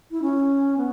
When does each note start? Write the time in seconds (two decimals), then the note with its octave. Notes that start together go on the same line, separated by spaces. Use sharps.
0.11 E4
0.22 C#4
0.77 B3